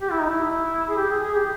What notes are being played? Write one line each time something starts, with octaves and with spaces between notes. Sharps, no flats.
G4
E4
D#4
E4
G#4
G4
G#4
G#4
G4